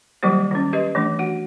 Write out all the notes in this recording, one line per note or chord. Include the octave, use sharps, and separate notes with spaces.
D#3 F#3 G3 A#3 G4 C5
D#3 C#4
G4 B4 D#5
E3 A3 D4
F#4 F#5